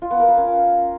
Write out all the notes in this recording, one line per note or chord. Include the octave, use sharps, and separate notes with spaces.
F4
B3
A#4
F5
C#4